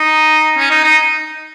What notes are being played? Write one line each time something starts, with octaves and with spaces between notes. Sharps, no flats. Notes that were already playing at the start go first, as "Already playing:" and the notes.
Already playing: D#4
C#4
D#4
D#4